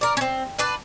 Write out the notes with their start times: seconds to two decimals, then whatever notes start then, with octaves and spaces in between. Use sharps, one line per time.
0.01 A#4 D5
0.17 C4 C#4
0.59 D4 B4 D5